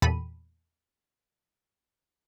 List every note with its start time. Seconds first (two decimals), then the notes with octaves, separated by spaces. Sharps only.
0.02 E2 A#2 G4 A4 B5 D#7